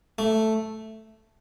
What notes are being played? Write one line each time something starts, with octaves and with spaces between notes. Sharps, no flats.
A3